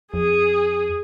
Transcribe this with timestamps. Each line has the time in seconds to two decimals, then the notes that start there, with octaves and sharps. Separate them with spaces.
0.14 F2 G#4